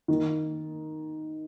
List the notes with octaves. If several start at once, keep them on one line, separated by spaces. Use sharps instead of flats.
D#3